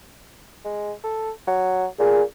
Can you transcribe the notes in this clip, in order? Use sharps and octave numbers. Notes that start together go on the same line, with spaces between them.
G#3
A4
F#3
A#2 G#4